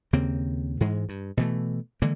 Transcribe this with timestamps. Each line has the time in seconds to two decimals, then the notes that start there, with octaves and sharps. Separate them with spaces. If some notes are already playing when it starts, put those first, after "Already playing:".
0.13 D#2 C#3 A#3 C4
0.81 G#2 E3 G#3
1.09 G2
1.37 B2 E3 A3
2.02 D3 E3 G#3 A#3